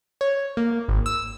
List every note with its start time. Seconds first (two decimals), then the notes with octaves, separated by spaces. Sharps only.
0.21 C#5
0.57 A#3
0.88 G#1
1.06 E6